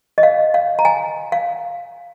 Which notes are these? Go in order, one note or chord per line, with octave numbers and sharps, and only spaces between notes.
D#5
F5
F5
A#5
G#5
F5